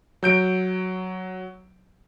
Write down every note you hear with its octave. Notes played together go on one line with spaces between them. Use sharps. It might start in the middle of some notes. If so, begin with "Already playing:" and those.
F#3 G6 D7